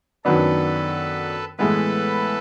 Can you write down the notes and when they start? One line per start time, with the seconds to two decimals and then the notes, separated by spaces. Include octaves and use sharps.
0.24 F#2 D#3 F#3 B3 D4 A4 B4
1.58 A2 E3 G#3 B3 E4 A4 B4